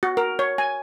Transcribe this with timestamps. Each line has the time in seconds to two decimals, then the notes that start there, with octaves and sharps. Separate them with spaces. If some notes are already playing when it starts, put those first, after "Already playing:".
0.03 F#4
0.17 A#4
0.39 C#5
0.58 G#5